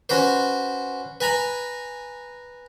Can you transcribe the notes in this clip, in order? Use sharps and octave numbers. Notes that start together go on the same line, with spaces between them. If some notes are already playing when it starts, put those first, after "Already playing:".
C#4 F#4 B4 C5
B4 G#5 A#5 B5